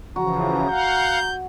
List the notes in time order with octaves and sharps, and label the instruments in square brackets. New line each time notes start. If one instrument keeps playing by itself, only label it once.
[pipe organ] C#3 E3 F3 [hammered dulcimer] F#4 [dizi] A#5
[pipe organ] F5 F#5 [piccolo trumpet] G6